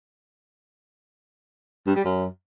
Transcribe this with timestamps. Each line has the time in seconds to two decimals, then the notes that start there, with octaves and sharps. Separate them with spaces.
1.87 G2
1.96 G3
2.05 F#2